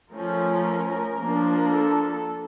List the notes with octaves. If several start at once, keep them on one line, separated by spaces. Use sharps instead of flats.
F3 A3 C#4 A#4
F3 A#3 D4
A4